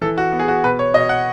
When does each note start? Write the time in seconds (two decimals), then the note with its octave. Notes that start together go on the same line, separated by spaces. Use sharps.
0.02 E3 A4
0.18 F#4
0.32 B3
0.39 G#4
0.48 F#4
0.63 B2 B4
0.79 C#5
0.94 B2 D#5
1.09 F#5